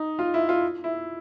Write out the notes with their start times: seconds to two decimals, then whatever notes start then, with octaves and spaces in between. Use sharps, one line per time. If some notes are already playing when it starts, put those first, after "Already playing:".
Already playing: D#4
0.19 F4
0.34 E4
0.49 F4
0.84 E4